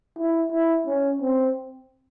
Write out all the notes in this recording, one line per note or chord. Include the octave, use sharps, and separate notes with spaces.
E4
E4
C#4
C4